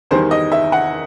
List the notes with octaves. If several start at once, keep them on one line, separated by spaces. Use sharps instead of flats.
E2 D#3 G3 C5
D#5
E5
F#5